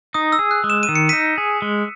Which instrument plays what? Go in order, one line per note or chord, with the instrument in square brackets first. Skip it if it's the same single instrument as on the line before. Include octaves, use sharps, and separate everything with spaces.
[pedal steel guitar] D#4 [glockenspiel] D#6
[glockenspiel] E6
[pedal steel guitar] G#4
[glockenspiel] F#6
[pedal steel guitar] G#3
[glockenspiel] E7
D#7
[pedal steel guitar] D#3
[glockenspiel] C#7
[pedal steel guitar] D#4 [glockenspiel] B6 D#7
[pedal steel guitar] G#4
G#3